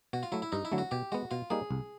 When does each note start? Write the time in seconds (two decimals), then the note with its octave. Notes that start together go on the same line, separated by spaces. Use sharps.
0.13 B2 F#4
0.23 F4
0.32 F#3 A3 E4
0.42 E4
0.52 G2 D#4
0.65 E4
0.72 D3 F#3 A3
0.78 F#4
0.91 B2 G4
1.12 G#3 B3 F#4
1.31 B2 F4
1.50 G3 A#3 D#4 G#4
1.71 C2